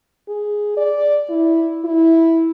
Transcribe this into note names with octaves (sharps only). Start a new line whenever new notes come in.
G#4
D5
E4
E4